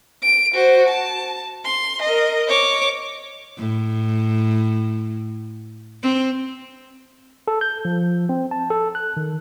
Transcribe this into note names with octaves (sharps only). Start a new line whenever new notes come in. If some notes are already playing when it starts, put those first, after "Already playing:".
D7
F#4 C5
A5
C6
A#4 D#5
C#5 D6
A2
C4
A4
G6
F3
C4
A5
A4
F#6
D#3